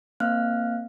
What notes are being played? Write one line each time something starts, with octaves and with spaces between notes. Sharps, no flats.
A#3 C4 F5 F6 F#6